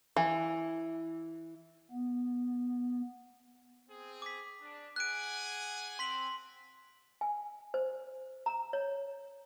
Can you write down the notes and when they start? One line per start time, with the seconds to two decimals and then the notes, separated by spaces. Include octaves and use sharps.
0.16 E3
1.91 B3
3.89 C4 G#4
4.22 D6 B6
4.60 D4
4.96 G#4 F#5 G#5 F#6 D7
5.99 C4 C6 B6 F#7
7.21 G#5
7.74 C5
8.46 A#5
8.73 C#5